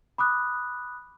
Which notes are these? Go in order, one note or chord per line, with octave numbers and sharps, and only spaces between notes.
B5 D6 D#6 F#6